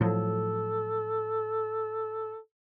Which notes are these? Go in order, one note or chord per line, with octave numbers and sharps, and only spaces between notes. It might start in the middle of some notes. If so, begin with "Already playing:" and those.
A2 F3 F#3 A4